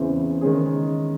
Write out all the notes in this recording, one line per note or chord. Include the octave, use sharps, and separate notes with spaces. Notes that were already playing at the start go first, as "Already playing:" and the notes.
Already playing: E2 C#3 E3 C4
D#3 G#3 C#4 G#4